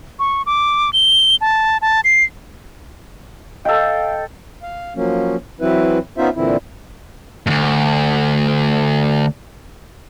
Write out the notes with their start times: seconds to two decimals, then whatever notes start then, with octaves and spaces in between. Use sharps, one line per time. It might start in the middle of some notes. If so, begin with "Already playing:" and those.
0.19 C#6
0.46 D6
0.93 G7
1.41 A5
1.82 A5
2.04 C7
3.65 A4 D#5 F5 G5
4.63 F5
4.96 F3 F#3 A#3 C#4
5.60 E3 F#3 C4 E4 B4
6.18 B3 C#4 D#4 F4 C5 E5
6.36 A#2 D3 E3 C4 E4
7.47 D2 G2